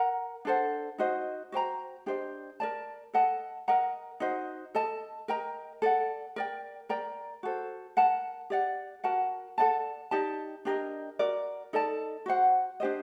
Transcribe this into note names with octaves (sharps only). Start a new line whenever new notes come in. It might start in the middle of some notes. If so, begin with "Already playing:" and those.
Already playing: A#4 F#5 A#5
D4 A4 C5 F#5
D#4 F#4 C5 D#5
F#4 C5 G5 A#5
D4 G4 C5 D#5
A#4 D5 A5
A4 D#5 F#5 A5
A#4 D#5 F#5 A#5
D#4 F#4 C5 D#5
A4 D#5 A5
A#4 D#5 G5 A#5
A4 D5 F#5
A#4 D5 G5
A#4 D5 G5 A#5
F#4 A4 C5
A#4 F#5 A5
G4 D5 F#5
F#4 A#4 F#5 A5
A4 D5 F#5 A5
D#4 G4 D5 A5
D4 G4 A#4 D#5
F#4 A#4 D5
D#4 A4 D5 A5
F#4 C5 F#5
D4 G4 C5 D#5